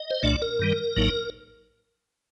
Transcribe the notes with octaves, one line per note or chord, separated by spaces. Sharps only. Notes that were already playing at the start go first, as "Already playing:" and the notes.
Already playing: D#5
C5
C2 A#2 A3 D4 D5
A#4
G2 D#3 G3
A1 A2 F#3 A#3 D#4